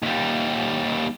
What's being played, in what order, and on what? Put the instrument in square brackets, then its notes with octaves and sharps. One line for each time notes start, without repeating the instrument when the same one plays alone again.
[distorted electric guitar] D#2 G3